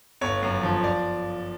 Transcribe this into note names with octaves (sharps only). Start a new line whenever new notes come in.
G1 C#5
F#2
F3
D5